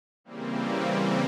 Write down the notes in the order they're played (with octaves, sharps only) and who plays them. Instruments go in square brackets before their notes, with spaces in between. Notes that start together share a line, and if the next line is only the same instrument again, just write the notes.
[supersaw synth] C#3 E3 G3 A#3 C4